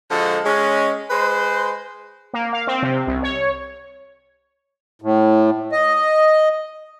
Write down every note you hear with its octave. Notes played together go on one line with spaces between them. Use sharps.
D3 F3 G#3 F#4 A4
G#3 C#4
G#3 B4 C5
A#3
F5
C4
C3
C2
C#5
A2
D#5